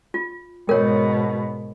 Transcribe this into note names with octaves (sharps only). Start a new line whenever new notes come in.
F4
G#2 B2 A#4 C#5